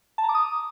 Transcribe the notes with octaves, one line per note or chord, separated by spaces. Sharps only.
A5
A#5
D6
D#6